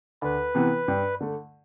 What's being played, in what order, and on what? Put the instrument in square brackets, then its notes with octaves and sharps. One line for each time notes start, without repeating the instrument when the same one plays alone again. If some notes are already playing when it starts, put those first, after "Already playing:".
[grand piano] D2 [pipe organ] B4
[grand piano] C3 E3 B3
G2
D3 A3